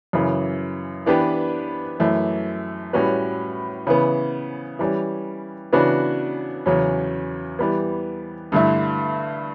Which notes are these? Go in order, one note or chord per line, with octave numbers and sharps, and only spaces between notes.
F#2 C#3 E3
E3 B3 D4 G4 B4
F#2 E3 A3
A2 G3 C#4 F#4 B4
C#3 E3 B3
E3 G3 C#4
C#3 E3 B3 D4 F#4
E2 C#3 F#3 C#4
E3 G3 B3
G2 D3 A3 E4